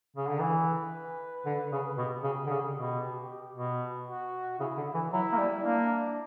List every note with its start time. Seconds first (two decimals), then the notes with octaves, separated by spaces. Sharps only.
0.17 C#3
0.29 D3
0.41 E3 B4
1.45 D3
1.72 C#3
1.97 B2 G4
2.23 C#3
2.46 D3
2.50 C#3
2.76 B2
3.55 B2
4.07 F#4
4.59 C#3 E4
4.77 D3
4.94 E3
5.12 F#3 E4
5.32 A#3
5.38 G3
5.64 A#3 D4